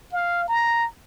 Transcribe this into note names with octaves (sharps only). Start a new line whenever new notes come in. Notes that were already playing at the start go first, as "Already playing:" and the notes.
F5
A#5